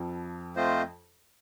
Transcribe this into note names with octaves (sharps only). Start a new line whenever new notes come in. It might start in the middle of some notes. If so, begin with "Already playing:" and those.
Already playing: F2 F3
A3 C4 F4 C5 D#5